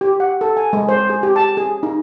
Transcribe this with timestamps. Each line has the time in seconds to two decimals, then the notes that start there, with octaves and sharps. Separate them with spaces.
0.01 G4
0.20 F#5
0.41 A4
0.57 G#5
0.73 G#3
0.89 C5
1.10 G#4
1.23 G4
1.36 A5
1.57 G#4
1.83 D#4